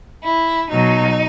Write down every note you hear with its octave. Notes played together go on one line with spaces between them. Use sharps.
E4
B2 F#3 D#4